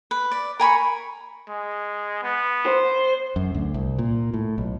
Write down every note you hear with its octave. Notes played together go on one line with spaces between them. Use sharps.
B4
D5
A#4 G#5 B5 C#6
G#3
B3
C5
F#2
D2
C2
A#2
A2
B1